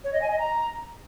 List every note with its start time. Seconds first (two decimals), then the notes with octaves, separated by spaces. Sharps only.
0.04 C#5
0.13 D#5
0.22 G#5
0.30 D#5
0.39 A#5